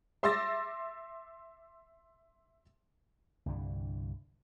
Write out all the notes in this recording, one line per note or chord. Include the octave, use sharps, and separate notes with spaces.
E5 C6 D6 E6 A6 A#6
C2 G2 D3 E3